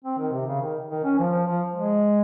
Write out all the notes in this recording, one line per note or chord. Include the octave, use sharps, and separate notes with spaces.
C4
D#3
C3
C#3
D#3
D#3
C#4
F3
F3
G#3